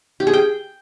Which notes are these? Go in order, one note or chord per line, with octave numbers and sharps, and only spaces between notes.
G4
G#4
G5